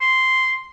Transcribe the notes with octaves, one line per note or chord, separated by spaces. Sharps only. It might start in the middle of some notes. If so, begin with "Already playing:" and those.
C6